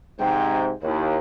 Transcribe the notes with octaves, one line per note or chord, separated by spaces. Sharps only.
G#2 C3 G5
D#2 E4